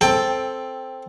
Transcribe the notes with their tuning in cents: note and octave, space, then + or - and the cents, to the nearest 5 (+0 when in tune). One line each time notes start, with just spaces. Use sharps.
C4 +0 A4 +0 G5 +15